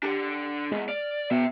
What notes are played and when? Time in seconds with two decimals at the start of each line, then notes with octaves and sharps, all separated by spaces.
0.03 D4 G4 A4
0.72 E2 G#3 B3
0.88 D5 F6
1.31 B2 E5 G5